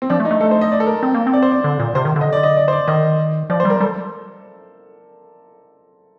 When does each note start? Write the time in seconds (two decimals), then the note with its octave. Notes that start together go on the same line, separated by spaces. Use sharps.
0.02 C4
0.10 F3 D4
0.20 A3
0.25 D#4
0.31 A3
0.41 A4
0.51 C5
0.61 D#5
0.72 D5
0.80 A4
0.87 A#4
1.03 C4
1.14 A#3
1.27 C4
1.33 D5
1.42 C5
1.51 D5
1.64 D3
1.80 A#2
1.95 C3 C5
2.05 D#3
2.16 D3
2.21 D#5
2.33 D5
2.43 D#5
2.57 D5
2.68 C5
2.73 D5
2.88 D#3 D#5
3.50 F3 D5
3.60 C5
3.65 G3 A#4
3.80 G3 A4